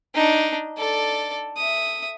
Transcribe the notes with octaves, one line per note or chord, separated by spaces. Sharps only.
D4 D#4
A4 D5
E5 D#6